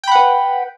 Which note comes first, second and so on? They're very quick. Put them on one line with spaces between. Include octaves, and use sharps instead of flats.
G5 B5 F#5 B4